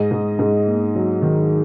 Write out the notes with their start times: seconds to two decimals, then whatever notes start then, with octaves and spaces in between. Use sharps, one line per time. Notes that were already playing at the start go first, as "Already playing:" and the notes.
Already playing: G#2 D#5
0.11 G#2
0.39 G#2
0.67 A#3
0.95 F#3
1.22 D#3